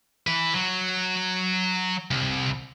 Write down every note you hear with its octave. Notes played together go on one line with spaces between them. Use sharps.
E3 B4
F#3
C2